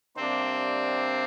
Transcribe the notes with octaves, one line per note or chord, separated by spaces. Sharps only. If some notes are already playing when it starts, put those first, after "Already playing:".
C3 G3 A#3 C4 D4 C5